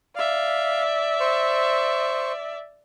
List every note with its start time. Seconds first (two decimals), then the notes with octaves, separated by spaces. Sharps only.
0.16 D5 E5 F5
1.20 C5 C#6